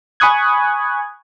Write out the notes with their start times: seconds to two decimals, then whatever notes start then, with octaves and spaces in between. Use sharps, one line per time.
0.20 G#5 B5 C#6 D#6 F#6 G#6